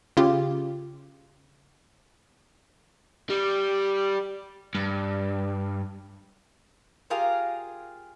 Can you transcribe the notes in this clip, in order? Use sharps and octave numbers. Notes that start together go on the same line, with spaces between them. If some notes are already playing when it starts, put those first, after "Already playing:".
C#3 F4 G4
G3
G2
F4 G4 G#4 A#4 F5